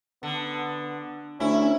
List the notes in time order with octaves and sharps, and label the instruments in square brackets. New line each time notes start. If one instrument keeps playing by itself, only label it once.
[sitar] D3 [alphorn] B3
[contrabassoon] D2 [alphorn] C#4 [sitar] E4